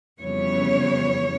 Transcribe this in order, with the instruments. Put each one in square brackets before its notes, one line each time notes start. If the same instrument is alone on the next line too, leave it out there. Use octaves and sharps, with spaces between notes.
[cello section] F2 C#3 E3 G3 B3 C#5